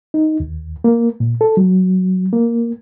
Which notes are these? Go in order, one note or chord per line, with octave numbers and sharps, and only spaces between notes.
D#4
D#2
A#3
A#2
A4
F#3
A#3